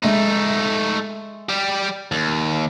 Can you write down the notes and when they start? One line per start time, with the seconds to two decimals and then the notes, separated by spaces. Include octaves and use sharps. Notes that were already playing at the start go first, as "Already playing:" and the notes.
0.04 G#3 A3 D#4 E5
1.49 G3 G4
2.11 D#2